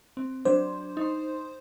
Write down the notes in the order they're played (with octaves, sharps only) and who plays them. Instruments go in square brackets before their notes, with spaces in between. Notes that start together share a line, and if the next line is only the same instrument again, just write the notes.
[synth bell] C4
[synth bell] F#3 D4 [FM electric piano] C5
[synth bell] D#4 C6